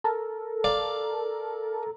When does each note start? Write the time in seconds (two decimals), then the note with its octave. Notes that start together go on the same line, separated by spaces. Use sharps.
0.04 A4 A#4
0.64 D5 F5